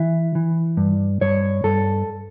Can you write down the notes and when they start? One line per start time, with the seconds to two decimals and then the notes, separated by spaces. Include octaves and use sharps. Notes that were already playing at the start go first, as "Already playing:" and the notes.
Already playing: E3 E5
0.35 E3
0.77 G2
1.21 G2 C#5
1.64 G2 A4